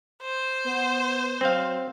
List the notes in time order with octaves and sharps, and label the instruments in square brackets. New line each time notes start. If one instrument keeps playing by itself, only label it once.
[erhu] C5
[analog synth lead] B3
[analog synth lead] F#3 [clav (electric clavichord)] C4 F5